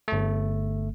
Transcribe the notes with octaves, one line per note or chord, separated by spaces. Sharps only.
G1 A3